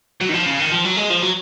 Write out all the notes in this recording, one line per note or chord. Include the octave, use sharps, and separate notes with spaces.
F#3
D#3
F3
C#3
D#3
F3
F#3
G#3
F3
F#3